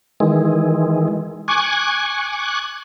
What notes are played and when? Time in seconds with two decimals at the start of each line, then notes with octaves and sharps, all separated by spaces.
0.20 D#3 E3 G#3
1.48 G#5 C#6 D6 F#6 G#6